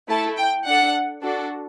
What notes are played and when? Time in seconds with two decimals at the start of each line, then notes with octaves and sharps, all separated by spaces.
0.09 A3 E4 A4 A5
0.37 G5
0.66 D4 A4 F#5
1.23 D4 F#4 A4